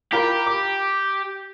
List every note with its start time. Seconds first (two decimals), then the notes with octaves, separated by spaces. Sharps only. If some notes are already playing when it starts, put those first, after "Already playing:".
0.12 F4 G4 A#4 B5
0.47 D6